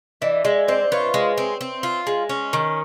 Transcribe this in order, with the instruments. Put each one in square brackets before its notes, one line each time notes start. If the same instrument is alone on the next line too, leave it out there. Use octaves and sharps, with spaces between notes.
[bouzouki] E3 [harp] D5 E5
[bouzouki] G#3 [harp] D5 E5
[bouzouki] C4 [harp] C5 D5
[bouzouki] F4 [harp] B4 C#5
[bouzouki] G#3
C4
C4
F4
G#3
C#4
D#3